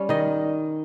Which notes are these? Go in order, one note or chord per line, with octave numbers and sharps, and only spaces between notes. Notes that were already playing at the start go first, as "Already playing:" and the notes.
Already playing: G3 C#4
D#3 D#5